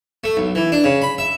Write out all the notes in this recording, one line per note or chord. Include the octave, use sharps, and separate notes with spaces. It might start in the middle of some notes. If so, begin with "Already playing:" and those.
A3
B1
E3
D4
C#3
B5
E5